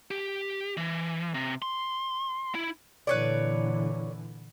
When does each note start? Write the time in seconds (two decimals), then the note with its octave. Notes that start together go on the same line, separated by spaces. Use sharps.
0.11 G4
0.77 E3
1.34 C3
1.62 C6
2.55 E4
3.07 A#2 D3 E3 B4 C#5 D5